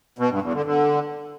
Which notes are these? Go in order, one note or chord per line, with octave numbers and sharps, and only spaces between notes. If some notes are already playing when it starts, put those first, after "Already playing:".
B2
G2
E2
D3
D3